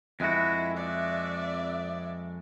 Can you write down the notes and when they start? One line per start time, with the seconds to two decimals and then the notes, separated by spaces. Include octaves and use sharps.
0.20 F2 G#3 E4 F#4
0.77 D5 E5